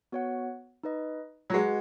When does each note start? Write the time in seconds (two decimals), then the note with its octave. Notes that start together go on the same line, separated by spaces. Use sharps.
0.12 B3 F#4 C#5 F#5
0.83 D#4 B4 D#5
1.50 F#3
1.54 G#3 F#4 B4 D#5 F#5